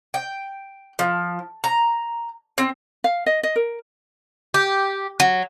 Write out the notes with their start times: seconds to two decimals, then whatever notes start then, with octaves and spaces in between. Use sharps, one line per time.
0.14 G5
0.99 F3
1.64 A#5
2.58 C4
3.04 F5
3.26 D#5
3.43 D#5
3.56 A#4
4.54 G4
5.20 F#3